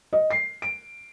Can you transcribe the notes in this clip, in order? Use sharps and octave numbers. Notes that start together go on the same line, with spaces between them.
D#5
C7
D7